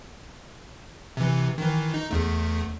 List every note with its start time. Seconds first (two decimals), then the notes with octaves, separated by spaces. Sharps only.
1.17 C3 E3
1.58 D#3 E3
1.94 D#4
2.11 E2 A3